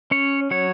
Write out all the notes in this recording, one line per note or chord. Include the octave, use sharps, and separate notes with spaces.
C#4 C#5
F#3 C#5